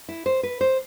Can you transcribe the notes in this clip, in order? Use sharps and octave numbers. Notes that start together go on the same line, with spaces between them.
E4
C5
B4
C5